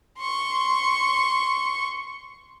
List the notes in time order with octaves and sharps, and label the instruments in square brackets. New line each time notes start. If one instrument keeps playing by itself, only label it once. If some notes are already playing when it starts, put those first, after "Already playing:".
[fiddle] C6 C#6